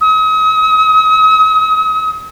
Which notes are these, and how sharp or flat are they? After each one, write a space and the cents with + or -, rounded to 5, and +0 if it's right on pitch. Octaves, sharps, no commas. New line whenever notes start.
D#6 +40